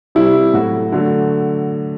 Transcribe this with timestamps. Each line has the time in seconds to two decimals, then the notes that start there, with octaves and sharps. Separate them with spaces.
0.15 C3 G3 E4
0.53 A2 F#3 A3 F#4
0.92 D3 F#3 A3